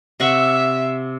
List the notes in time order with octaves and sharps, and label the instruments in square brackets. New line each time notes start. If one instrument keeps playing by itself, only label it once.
[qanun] C3 F#5 C#6 [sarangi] E5